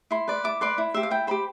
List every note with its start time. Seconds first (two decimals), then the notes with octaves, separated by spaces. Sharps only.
0.11 E4 C6
0.28 B4 D5
0.44 E4 D6
0.61 B4 D5 C6
0.78 E4
0.94 G4 C5 E5
1.03 F5
1.11 E4 G5
1.27 G4 C5 B5